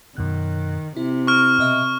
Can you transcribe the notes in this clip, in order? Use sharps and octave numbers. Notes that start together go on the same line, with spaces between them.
F#2 B2 D#3 F#6
C3 E4
C#6 F6
B2 D#5 E5